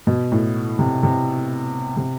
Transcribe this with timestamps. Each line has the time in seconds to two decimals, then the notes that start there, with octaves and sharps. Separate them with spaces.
0.07 B2
0.32 A2
0.79 C3
1.03 C3
1.97 C3